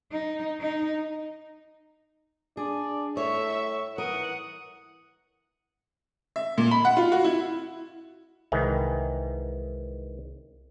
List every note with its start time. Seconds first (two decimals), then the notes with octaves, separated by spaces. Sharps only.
0.12 D#4
0.61 D#4
2.57 D4 G#4 D5
3.17 A2 C#5 E5 C#6
3.98 E3 A#4 F#5 D#6
6.36 E5
6.58 A#2
6.71 B5
6.85 F#5
6.97 F4
7.12 F#4
7.24 E4
8.52 C2 G#2 D#3 E3